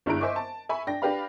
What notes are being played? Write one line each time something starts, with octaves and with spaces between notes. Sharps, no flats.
G1 G2 G#3 E4 A#5 D7
C5 D#5 E5 G#5 C#6 D6
A5
E5 G#5 B5 C#6
D4 G5 A#6
D4 G4 B4 F5 B5